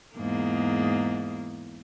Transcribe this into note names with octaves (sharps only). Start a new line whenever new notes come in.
E2 G#2 A#3